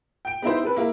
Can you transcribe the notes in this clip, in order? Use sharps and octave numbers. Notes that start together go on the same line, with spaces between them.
G5 D7
B3 D#4 E4 C5
C4 A4 B4
A#3 E4 A#4